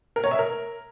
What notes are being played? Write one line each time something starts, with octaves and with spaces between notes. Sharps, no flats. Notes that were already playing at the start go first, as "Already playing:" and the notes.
A#4
C#5
E5
A#4